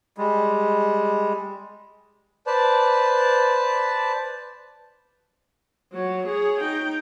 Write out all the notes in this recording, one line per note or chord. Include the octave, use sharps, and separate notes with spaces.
G3 G#3
B4 C5 D5 A5
F#3 C#5
G#4 C#5
D#4 G5